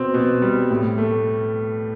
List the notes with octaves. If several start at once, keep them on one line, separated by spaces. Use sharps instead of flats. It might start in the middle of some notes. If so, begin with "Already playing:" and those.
Already playing: B2 C4
B2
G3
A2
A3